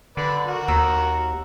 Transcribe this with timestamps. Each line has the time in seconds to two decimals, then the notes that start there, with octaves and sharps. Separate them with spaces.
0.17 D3 B4 D5
0.47 F#4 A#4
0.68 D#2 A#5 E6 A#6